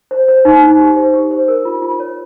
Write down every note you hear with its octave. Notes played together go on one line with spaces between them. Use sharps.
C5
C5
D#4
D#4
G4
C5
G4
C5
A#4
F4
F4
C#5